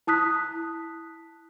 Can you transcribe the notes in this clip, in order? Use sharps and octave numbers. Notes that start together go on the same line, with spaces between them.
E4 A5 D#6 F#6 B6